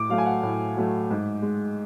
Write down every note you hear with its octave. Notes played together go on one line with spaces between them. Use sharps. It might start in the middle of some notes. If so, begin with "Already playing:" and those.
Already playing: A2 D6
F#3 A3 F5
G#5
F#5
A2
F#3 A3
G#2
G#3